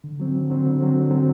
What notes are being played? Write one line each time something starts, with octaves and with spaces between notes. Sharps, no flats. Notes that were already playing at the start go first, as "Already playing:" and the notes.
D3
F#3 C4
D3
F#3 C4
D3
F#3 C4
D3
F#3 C4